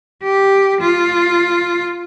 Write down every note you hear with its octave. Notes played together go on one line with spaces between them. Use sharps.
G4
F4